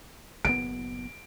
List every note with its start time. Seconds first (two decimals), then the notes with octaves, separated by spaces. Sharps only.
0.45 F#1 A2 B3 D7